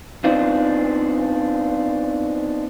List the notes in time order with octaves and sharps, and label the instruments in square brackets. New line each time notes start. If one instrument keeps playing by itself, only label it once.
[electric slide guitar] B3 C4 D4 D#4 F4